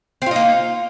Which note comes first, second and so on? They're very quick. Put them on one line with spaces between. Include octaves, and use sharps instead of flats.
C4 F4 D#4 A#3